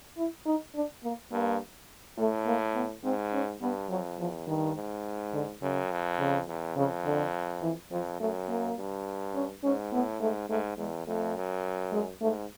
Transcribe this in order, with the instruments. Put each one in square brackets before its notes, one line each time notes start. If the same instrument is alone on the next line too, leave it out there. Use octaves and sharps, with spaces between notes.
[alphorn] E4
D#4
D4
A#3
[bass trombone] G2 [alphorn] A#3
[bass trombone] A2 [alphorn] A3
[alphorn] A#3
B3
[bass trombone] G#2 [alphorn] C4
[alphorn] C#4
[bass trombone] G2 [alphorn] B3
[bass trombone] F2 [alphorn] F#3
[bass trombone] E2 [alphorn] F3
[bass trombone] G2 [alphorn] D#3
[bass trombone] G#2
[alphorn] D3
[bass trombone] F#2 [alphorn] C#3
[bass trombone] F2
[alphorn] C#3
[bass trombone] E2
[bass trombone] F2 [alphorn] C#3
[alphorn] D3
E3
[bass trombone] F2 [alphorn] F3
[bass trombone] F#2 [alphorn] A3
[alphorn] A#3
[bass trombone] G2
[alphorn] C#4
[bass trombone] G#2 [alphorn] C#4
[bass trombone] A2 [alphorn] B3
[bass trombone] G#2 [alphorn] A3
[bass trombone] G#2 [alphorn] A3
[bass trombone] E2 [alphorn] G#3
[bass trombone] F2 [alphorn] A3
[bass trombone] F#2
[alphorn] G#3
[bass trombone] G#2 [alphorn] A3